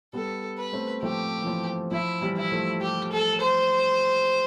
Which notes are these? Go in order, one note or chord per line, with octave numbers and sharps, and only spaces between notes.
G3 B3 A4
B4
A3 C4
F3 A3 G4
E3
F3
F3 E4
E3 G3
E4
F3 A3
G4
A4
C5